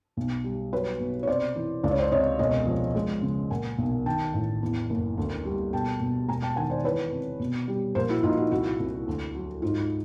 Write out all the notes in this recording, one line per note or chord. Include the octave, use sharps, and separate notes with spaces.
B1
G3
F#3 B4 C#5
B2
C#5
C3 C5 D5
E3
C#2 D5
C#5
C5 D5
C3 C#5 D#5
E1 C#5 D#5
F3
G#3
C#3
A#2 F#5 G#5
B1
D#3 G5 A5
A1
E2
F#1
D2
G3
B2 G5 A5
B2
E1 G#5 A#5
G5 A5
D#3 F#5 G#5
C5 D5
E3 B4 C#5
C3
B2
G3
A#1 A#4 C5
E4 F#4
A#1 D#4 F4
E4 F#4
C2 E4 F#4
C2
D2
F#3
G#2 D#4 F4